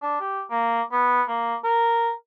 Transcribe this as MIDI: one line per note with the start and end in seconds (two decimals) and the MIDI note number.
0.02 0.19 62
0.20 0.42 67
0.50 0.82 58
0.92 1.22 59
1.28 1.55 58
1.64 2.11 70